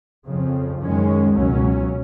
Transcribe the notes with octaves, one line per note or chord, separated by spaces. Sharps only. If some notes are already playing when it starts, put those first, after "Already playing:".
F2 C#3 F3
F#2 D#3 G#3 C#4
C#2 B2 F#3 C#4